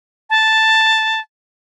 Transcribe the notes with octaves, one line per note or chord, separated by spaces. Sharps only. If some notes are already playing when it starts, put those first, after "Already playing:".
A5